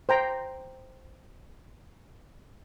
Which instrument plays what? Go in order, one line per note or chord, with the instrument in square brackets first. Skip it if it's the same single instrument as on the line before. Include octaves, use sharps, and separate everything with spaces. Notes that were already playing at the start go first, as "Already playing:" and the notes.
[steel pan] C5 G5 A#5